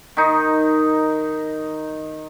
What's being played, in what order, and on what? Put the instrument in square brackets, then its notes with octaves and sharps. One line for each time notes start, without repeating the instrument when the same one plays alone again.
[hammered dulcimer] D#3 D#4